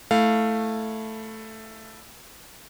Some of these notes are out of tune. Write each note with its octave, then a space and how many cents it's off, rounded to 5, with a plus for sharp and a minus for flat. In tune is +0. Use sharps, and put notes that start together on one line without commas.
A3 +0 E4 +0 F5 +0